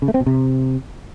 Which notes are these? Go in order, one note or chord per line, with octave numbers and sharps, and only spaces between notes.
C#3
A3
C4
B2
C3